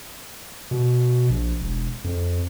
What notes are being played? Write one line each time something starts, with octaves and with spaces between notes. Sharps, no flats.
B2
A#1
E1
F2